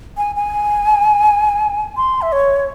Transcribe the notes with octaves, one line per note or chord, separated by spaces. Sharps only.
G#5
G#5
C6
E5
C#5